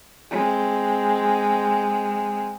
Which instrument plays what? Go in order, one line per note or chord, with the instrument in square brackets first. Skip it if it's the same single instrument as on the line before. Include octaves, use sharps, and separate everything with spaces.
[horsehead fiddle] G#3 C4